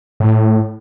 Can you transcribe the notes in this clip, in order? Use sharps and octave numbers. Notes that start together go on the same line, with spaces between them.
A2